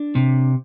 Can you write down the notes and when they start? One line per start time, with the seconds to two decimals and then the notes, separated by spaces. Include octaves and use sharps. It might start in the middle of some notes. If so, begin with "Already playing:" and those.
Already playing: D4
0.15 C3